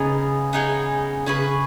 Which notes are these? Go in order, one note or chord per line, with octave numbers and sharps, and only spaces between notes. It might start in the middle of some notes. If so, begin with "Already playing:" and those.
Already playing: C#3 B3 D#4 G#4
B3 D#4 G#4
C#3 C#4 G#4 B4